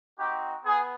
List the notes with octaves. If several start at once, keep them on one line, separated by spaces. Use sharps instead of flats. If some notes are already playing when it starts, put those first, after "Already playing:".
C4 D#4 F#4 G4
B3 G#4